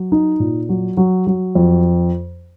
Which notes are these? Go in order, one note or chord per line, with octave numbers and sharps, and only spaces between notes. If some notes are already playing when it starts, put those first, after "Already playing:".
Already playing: F#3
D#4
A#2
F#3
F#3
F#3
F2